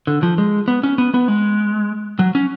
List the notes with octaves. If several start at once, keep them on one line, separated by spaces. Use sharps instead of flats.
D3
F3
G#3
B3
C#4
B3
B3
G#3
F#3
C#4